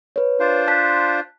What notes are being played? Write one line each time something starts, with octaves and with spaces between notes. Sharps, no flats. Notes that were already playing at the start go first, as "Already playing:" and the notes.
B4 C#5
D4 F4 C5
A5 F#6 B6